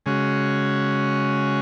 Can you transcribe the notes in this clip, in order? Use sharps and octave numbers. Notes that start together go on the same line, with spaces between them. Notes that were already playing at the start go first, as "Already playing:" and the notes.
C#3 G#3 C#4 F#4